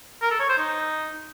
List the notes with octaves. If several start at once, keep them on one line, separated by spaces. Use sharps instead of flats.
A#4
A4
C#5
C5
D#4